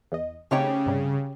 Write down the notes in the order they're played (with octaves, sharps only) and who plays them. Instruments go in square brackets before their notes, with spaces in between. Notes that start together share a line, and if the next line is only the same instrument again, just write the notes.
[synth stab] E2 D#5
[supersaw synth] C#3 [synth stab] A3 C4 D#4 [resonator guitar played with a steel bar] G4 C#5 G5
[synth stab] G2 C3 G3